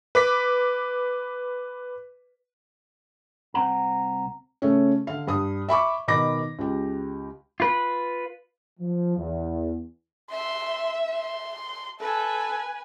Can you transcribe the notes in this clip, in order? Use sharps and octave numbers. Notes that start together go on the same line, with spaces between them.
B4 D6 B6
C2 C4 F#5 A#5
C#3 A3 C#4
D3 F5
G2 D#6
E5 B5 C#6 D6
B2 D#3 B5 D6 A#6
C#2 G4
F4 B4
F3
E2
E5 C6
C6
A4 B4 G#5